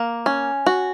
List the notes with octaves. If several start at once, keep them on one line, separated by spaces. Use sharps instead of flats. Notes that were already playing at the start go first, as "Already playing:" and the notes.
Already playing: A#3
C#4
F#4